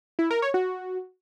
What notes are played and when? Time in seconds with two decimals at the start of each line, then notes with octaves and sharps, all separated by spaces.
0.19 E4
0.31 A#4
0.42 C#5
0.54 F#4